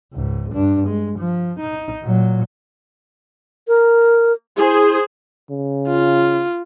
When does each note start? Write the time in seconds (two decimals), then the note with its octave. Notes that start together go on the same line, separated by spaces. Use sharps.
0.13 C#2 G#2
0.52 G2 D4
0.87 G#3
1.19 F3
1.60 D#4
2.03 A#2 F#3
3.68 A#4
4.57 E4 G#4 C5
5.50 C#3
5.88 F4